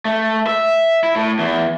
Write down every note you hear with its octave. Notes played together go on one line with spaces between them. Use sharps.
A3
E5
E4
A2
E2